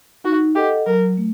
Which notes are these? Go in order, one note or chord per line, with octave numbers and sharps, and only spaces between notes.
D#4 F#4
G4 A4 D#5 F#5
F#3 A#4
A3